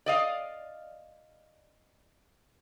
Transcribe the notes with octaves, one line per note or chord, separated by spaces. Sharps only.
D5 D#5 F5